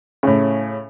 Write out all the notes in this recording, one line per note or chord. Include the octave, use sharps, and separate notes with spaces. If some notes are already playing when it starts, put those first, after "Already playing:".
A2 C#3